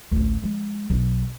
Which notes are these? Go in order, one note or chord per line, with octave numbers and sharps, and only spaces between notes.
A1 D2
F3 G#3
B1 B3